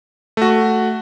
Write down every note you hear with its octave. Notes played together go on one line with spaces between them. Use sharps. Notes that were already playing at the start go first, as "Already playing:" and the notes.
A3 F#4